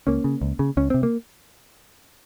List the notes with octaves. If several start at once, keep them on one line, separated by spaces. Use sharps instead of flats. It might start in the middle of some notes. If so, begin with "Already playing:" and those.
C#2 A#3 C#4
C#3
C#2
C#3
C#2 C#4
C3 C4
A#3